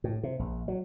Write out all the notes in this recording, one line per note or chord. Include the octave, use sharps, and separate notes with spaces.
A2
C3
A#1
F#3